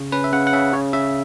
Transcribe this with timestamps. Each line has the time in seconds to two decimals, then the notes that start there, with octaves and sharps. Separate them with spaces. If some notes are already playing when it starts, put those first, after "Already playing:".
Already playing: C#3
0.12 C#4 B4
0.24 E5
0.32 C#3 F#5
0.47 F#5
0.53 C#3 E5
0.73 C#3 C#5
0.93 C#3 E5